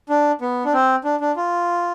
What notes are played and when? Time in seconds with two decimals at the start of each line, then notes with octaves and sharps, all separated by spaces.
0.09 D4
0.41 B3
0.65 D4
0.73 C4
1.04 D4
1.21 D4
1.36 F4